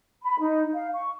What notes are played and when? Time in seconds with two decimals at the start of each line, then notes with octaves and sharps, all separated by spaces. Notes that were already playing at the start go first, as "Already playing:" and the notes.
0.23 B5
0.38 D#4
0.74 F5
0.94 C#6